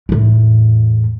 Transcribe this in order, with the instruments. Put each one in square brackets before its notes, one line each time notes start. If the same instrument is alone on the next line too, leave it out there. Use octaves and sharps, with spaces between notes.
[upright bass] E2 A2